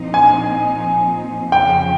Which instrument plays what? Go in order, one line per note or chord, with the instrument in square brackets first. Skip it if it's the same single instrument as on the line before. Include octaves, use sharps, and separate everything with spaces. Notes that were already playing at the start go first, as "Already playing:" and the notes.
Already playing: [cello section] A#2 F3 C4 D#4
[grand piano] G#5
[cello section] F2 C#3 F3 [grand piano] G5